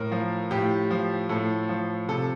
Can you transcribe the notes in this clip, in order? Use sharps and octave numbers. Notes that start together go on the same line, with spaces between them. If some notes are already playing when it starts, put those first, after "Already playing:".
Already playing: A2 A#4
F3
A2 G4
F3
A2 A4
F3
C3 A4